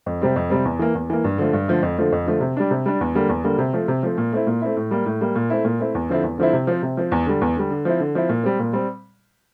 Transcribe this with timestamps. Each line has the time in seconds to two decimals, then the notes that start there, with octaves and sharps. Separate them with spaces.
0.06 F2
0.21 C3 G3 C4
0.36 F2
0.50 C3 G3 C4
0.65 E2
0.79 E3 A#3
0.95 E2
1.10 E3 A#3
1.24 G2
1.38 D3 F3 A3
1.53 G2
1.68 D3 F3 A3
1.82 F2
1.97 D3 F3 A3
2.12 F2
2.26 D3 F3 A3
2.41 C3
2.57 G3 D4
2.71 C3
2.86 G3 D4
3.01 E2
3.15 D3 G3 A#3
3.29 E2
3.44 D3 G3 A#3
3.58 C3
3.73 F3 A3 C4
3.88 C3
4.03 F3 A3 C4
4.18 A#2
4.32 A3 C4 E4
4.47 A#2
4.62 A3 C4 E4
4.77 A2
4.91 G3 A#3
5.06 A2
5.21 G3 A#3
5.36 A#2
5.50 A3 C4 E4
5.65 A#2
5.80 A3 C4 E4
5.95 E2
6.09 D3 F3 C4 E4
6.23 E2
6.38 D3 F3 C4 E4
6.53 C3
6.67 F3 C4
6.82 C3
6.97 F3 C4
7.12 E2
7.26 D3 G3
7.41 E2
7.56 D3 G3
7.70 D3
7.85 F3 C4 E4
8.00 D3
8.15 F3 C4 E4
8.29 A#2
8.44 G3 C4
8.59 A#2
8.73 G3 C4